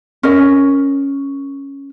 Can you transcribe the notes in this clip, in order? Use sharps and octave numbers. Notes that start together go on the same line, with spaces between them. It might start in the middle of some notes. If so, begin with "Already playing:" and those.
C#4 A#4 D#5